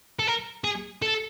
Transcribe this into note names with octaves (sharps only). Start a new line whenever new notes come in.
A4
A#4
G#4
A4